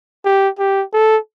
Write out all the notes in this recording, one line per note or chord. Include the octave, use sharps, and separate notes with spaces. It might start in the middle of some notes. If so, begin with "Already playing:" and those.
G4
G4
A4